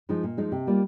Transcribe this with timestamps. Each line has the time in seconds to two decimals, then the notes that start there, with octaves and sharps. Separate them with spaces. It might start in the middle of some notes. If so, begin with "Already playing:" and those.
0.09 F3 G#3 D#4
0.23 A#2
0.37 F3 G#3 D#4
0.52 C3
0.67 G3 A#3 F4